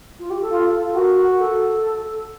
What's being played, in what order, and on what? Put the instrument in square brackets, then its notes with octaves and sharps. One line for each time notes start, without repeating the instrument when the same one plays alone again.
[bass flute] F4
G4
A4
[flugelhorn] F4
[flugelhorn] F#4 [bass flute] A#4
[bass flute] A4